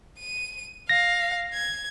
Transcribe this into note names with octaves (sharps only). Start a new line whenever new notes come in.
D#7
F5 A#6
G#6